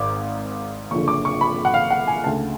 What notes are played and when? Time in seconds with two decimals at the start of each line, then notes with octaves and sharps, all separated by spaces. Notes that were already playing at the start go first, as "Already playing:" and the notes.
Already playing: G#1 G#2 D6
0.91 F#1 F2 D3 C#6
1.08 D6
1.25 C#6
1.41 B5
1.65 F#5
1.74 F5
1.90 F#5
2.07 G#5
2.24 D2 C#3 A5